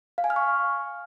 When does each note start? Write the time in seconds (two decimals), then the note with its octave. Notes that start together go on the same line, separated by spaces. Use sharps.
0.18 F5
0.24 G#5
0.30 F6
0.36 C#6